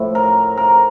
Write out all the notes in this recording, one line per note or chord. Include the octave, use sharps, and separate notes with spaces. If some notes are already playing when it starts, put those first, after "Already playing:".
Already playing: A2 F3
A#4
A#4